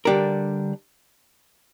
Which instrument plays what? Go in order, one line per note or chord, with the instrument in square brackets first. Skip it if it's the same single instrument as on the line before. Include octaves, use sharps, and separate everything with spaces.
[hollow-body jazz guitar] D3 G3 D4 G4 A#4